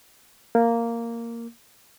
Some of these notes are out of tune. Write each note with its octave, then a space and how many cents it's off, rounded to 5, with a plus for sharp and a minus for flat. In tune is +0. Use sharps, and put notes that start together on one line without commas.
A#3 -5